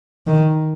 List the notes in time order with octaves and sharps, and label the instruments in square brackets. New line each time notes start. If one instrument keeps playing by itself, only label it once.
[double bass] D#3